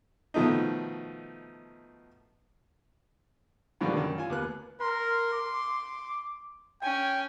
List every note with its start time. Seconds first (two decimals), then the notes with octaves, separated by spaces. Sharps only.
0.34 B2 D#3 F3 A3 D#4
3.81 G2 B2 D3 D#3 F3
3.95 F#2 D#3
4.18 F4 G#5
4.30 D#2 B3 F#6
4.81 A#4 C6
5.33 D6
6.83 C#4 G5 G#5